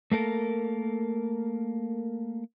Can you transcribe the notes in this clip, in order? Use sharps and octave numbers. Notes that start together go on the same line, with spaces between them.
A3 A#3 A4 A#4